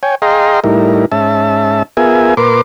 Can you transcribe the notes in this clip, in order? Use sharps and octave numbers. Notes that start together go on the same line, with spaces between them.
C#5 G5 G#5
G#4 D#5 F5 G5 A#5 C6
A2 G3 D#4 E4 A#4
G#2 C#4 E5 A5
B3 F4 G#4 A#4 E5 G#5
A#2 A#4 B4 C6 D6